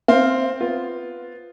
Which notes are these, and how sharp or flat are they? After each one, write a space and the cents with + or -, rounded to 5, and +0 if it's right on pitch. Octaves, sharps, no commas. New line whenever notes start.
C4 +0 F5 +0
B3 +0 F4 +0